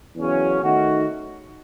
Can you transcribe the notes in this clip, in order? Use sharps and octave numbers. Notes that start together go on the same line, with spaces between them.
E2 C#3 F#3 C#4
D#3 A3 D#4 F#4